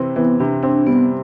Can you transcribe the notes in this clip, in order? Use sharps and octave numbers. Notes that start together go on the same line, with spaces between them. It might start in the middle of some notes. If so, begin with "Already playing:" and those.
Already playing: C3 E3 C4
E3 B3
C3 D4
C4 D4
G3 B3